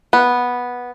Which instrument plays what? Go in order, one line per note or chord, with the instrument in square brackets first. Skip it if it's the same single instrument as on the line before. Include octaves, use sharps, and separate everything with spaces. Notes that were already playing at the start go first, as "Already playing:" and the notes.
[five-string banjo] B3